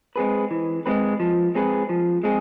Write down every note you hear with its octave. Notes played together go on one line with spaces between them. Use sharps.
G#3 C4 G#4 B4
E3
G#3 C4 G#4 B4
F3
G#3 C4 G#4 B4
F3
G#3 C4 G#4